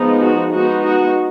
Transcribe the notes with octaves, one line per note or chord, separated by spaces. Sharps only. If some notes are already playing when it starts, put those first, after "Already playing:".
Already playing: F3 G#3 B3 D#4
F#4
G#3 B3 D#4 F#4
F#4